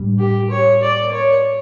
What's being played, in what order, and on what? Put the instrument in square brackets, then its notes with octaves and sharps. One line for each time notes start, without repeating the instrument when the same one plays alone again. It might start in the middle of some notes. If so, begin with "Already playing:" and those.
Already playing: [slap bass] A2 G3 D4
[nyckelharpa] G4
C#5
D5
C#5